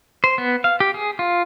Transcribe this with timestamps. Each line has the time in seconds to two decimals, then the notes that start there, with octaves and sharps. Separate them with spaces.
0.24 C5
0.38 B3
0.64 F5
0.80 G4
0.94 G#4
1.19 F4